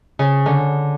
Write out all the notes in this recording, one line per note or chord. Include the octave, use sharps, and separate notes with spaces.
C#3
D3